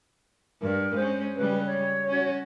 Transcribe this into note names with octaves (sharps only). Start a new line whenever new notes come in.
G2 A#4
G#3 C#4 C5
C#3 G3 B4
C#5
C#4 F#4